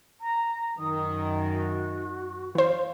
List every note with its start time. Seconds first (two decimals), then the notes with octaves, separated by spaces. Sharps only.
0.21 A#5
0.78 F#2 D#3 D#6
1.52 F#4
2.55 E3 C5 F5